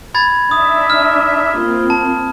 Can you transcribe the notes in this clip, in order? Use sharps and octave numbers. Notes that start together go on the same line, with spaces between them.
B5 G#6 A6
D4 D#4 E5 D#6
F6
A#3 C4 F4
A5